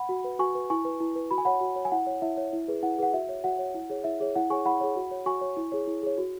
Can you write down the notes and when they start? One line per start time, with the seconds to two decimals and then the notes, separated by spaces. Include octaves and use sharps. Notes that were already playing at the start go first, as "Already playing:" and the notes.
Already playing: F#5 B5
0.09 F#4
0.24 B4
0.39 F#4 G#5 C#6
0.55 B4
0.70 E4 G#5 C#6
0.85 B4
1.00 E4
1.15 B4
1.31 F#4 B5
1.38 G#5
1.45 C#5 F#5 B5
1.61 F#4
1.76 C#5
1.85 G#5
1.92 E4 F#5
2.07 C#5
2.22 E4 E5
2.37 C#5
2.53 E4
2.68 G#4 B4
2.83 E4 F#5
2.98 G#4 B4 F#5
3.13 F#4 E5
3.29 C#5
3.44 F#4 F#5
3.59 C#5
3.74 E4
3.90 G#4 C#5
4.04 E4 E5
4.20 G#4 C#5
4.36 E4 F#5
4.50 G#4 C#5 G#5 C#6
4.65 E4 F#5 B5
4.81 G#4 C#5
4.96 F#4
5.11 C#5
5.26 F#4 G#5 C#6
5.41 C#5
5.57 E4
5.72 G#4 C#5
5.87 E4
6.03 G#4 C#5
6.18 F#4